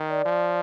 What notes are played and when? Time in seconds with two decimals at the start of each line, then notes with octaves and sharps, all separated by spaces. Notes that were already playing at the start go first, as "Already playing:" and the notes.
Already playing: D#3
0.08 D5
0.25 F3